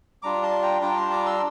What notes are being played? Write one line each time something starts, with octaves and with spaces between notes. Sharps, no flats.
G3 D4 F4 A#5 D6
A5 C6
G5 A#5
G3 D4 F4 G5 A#5
A5 C6
A#5 D6
C6 E6